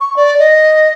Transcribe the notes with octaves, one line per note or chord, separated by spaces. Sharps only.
C#6
D5
D#5